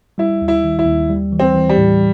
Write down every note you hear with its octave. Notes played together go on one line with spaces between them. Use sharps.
G3 E4
D#2
E4
D#3
E4
D#2
G3
E3
C4
E3
G3
A2